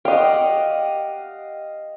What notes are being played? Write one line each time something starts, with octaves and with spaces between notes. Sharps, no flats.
G4 D#5 F5 F#5